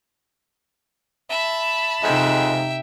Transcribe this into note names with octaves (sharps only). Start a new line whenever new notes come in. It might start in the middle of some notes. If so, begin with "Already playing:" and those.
E5 A5 B5
F2 C3 G#3 D#4 E5 G5